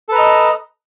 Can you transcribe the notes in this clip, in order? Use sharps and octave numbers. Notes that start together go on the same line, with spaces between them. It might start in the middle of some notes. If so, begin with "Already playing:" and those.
A4 B4 D#5 A#5